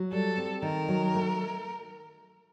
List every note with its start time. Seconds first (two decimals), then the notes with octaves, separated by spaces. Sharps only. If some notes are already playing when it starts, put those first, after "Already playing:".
Already playing: F#3
0.12 G3 A4
0.38 C4
0.62 D#3 A#4
0.88 F#3
1.15 A3